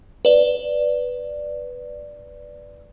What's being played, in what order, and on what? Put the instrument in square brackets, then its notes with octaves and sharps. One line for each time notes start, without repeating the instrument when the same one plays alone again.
[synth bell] B4 D5